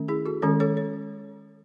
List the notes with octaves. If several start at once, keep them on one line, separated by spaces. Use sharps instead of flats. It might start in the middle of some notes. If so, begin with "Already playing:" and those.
Already playing: D#3 A3 C#4
E4 G#4
F#4 A4
D#3 G#3 C#4 A4 C#5
A4 C#5
C#5